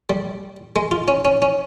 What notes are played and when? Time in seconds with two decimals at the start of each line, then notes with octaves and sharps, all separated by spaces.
0.10 G3
0.76 G#3
0.91 F4
1.08 C#4
1.25 C#4
1.42 C#4